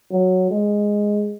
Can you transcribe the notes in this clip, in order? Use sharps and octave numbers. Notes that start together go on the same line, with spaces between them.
F#3
G#3